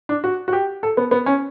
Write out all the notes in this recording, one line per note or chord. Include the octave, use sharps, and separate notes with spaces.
D4
F#4
F#4
G4
A4
B3
B3
C#4